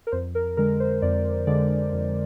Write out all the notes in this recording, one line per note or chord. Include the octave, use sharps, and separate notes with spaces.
A#4
F2 C5
A#4
D3 G#3 A#4
C5
F2 D5
D3 G#3 D5
F2